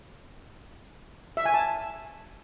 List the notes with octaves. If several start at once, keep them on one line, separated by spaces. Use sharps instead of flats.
E5
G#5
A5